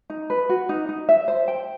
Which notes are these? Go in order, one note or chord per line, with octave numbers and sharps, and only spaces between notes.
D#4
B4
F#4
D#4
D#4
E5
C5
G5